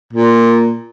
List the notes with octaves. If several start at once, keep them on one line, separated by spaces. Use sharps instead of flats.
A#2